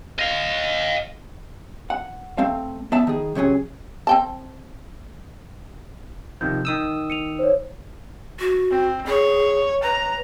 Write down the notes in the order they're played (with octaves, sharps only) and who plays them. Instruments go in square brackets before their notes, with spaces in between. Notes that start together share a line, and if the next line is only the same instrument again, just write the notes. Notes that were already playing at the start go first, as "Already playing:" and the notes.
[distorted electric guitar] D#5 F5
[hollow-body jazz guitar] F#5
A3 C4 F5
B3 D5 E5 A5
D#3 G#4
C3 F#3 C#4 G#4
[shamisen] C4 G5 A5
[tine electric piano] C3 D#3 F3 [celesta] G6
[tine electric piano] D#3 D#6 E6
[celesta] C#7 D#7 F7
C5 C#5
[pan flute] F#4
[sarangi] C4
[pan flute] G#4 [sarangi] C#5
[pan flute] B4 [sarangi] A#5